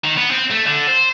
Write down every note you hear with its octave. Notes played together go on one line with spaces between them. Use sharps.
D#3
B3
C4
A3
D3
C5